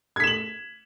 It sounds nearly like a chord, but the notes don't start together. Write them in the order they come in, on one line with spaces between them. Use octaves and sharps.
G#6 B6 E7 F#7